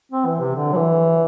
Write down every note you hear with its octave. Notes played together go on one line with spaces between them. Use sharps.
C4
E3
C3
D3
F#3
E3